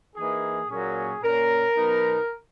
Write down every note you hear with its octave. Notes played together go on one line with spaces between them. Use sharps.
E3 A#3 D#4 G#4
A#2 F#3 A#3 C#4 G#4
A#2 A#3 C#4 A#4
B2 F#3 B3 D#4